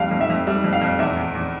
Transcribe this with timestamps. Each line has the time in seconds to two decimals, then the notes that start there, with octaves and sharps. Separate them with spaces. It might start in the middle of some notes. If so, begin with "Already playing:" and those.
Already playing: F2 G3 F5
0.11 F2
0.21 E5
0.30 F2
0.47 G3 E5
0.64 F2
0.73 F5
0.81 F2
0.99 E2 E5
1.17 E2
1.35 E2